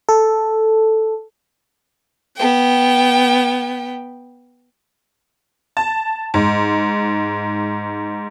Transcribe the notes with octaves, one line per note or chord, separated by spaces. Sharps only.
A4
B3 G5
A5
G#2